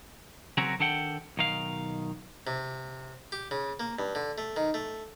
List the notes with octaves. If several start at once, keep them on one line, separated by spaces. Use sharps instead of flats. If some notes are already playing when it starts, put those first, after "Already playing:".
C#3 F#3 C4 C#4 F#4 A#4
D#3 D4 A4 F#5 G5
B1 D#3 F5
C3
G4
C#3
A#3
G2
D3
A3
D#3
A3